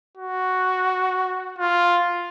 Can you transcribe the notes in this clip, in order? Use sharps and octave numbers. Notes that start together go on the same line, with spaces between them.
F#4
F4